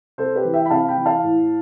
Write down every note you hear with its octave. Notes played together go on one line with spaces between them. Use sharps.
C3 A4 C5
G4 B4
E3
E5 G5
B5
C3 F5 A5
G5 B5
E3
F5 A5
A2